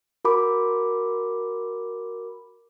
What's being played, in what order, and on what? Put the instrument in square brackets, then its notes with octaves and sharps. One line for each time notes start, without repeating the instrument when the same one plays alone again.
[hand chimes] F#4 A#4 B5 D6